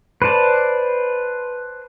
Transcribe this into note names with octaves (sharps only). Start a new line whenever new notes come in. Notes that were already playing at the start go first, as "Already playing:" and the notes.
B4 C5 D5 A5